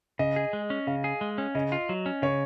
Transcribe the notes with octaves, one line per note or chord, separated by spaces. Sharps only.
C#3 D#5
G#4
G#3
C#4
C#3 F5
G#4
G#3
C#4
C#3 D#5
F4
F#3
C#4
C#3 C#5